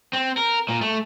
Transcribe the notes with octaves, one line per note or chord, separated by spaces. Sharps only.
C4
A#4
A#2
A3